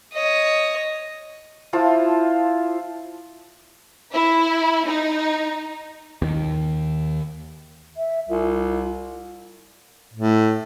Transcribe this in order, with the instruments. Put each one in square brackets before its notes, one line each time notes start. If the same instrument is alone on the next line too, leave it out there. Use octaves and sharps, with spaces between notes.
[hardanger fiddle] C#5 D#5
[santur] F3 E4 F4 A5
[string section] E4
D#4
[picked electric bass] D#2 D#3
[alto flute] E5
[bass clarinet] C2 [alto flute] F4
[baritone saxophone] A2